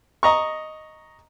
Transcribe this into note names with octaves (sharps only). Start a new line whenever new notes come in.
D#5 A#5 C#6